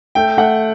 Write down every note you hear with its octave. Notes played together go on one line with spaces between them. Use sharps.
A3 G5
A3 F#5